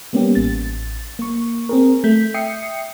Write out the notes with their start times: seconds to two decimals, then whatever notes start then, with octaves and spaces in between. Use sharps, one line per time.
0.13 G3 A#3 B3 C#4 G4
0.35 A1 A6
1.19 A#3 C#6
1.69 C4 G#4 A#4
2.04 A3 G6 B6
2.34 E5 G5 D#6 C7 C#7